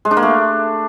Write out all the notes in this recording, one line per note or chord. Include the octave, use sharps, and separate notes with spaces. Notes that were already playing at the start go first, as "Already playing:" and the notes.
G#3
D4
A#3
A3